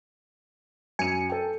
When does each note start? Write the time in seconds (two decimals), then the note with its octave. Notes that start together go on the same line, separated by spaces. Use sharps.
0.99 F#2 G#5 C#7 D#7
1.29 A4 G5